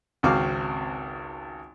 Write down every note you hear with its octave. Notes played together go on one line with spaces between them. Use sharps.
G#1 C#2 C4 F#4 F5 D6